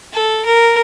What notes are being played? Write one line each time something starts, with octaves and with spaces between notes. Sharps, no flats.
A4
A#4